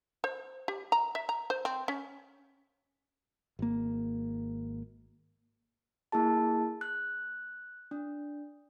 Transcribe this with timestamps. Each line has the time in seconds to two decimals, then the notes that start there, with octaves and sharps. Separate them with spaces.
0.24 C5
0.68 G4
0.92 A#5
1.15 E5
1.29 A#5
1.50 C5
1.65 C4
1.88 C#4
3.59 G#1 A#3
6.12 A#3 E4 G#4 A5
6.81 F#6
7.91 D4